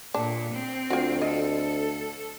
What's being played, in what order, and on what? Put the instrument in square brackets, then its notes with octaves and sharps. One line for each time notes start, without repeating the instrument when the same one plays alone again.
[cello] A#2 [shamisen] D4
[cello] C4
[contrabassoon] D2 [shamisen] F4 F#4
[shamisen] F4 D#5 [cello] A4